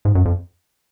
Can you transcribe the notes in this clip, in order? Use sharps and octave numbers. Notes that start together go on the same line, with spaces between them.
G#2
F#2
F2